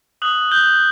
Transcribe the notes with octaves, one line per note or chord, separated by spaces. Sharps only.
D#6 F#6 F#7
F#6 G6 G7